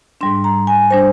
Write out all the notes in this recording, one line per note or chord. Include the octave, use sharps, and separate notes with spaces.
G#2 G3 D4 C6
A#5
G#5
G3 D4 C5